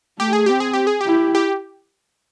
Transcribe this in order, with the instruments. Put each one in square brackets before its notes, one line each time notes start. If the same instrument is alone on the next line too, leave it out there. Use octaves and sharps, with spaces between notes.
[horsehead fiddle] A3 [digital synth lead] G4
[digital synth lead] G#4
[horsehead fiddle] C4 [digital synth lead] G4
[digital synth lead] G#4
G4
G#4
G4
[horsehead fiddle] E4
[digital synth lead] G4